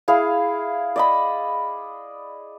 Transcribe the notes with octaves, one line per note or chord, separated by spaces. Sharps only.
E4 G#4 F5
D5 D#5 B5